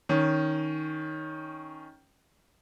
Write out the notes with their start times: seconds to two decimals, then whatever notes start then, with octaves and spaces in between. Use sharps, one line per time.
0.09 D#3 C#4